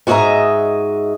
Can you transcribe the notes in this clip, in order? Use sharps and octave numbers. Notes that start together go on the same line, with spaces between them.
G#2 F#4 G#4 D#5 E5 A#5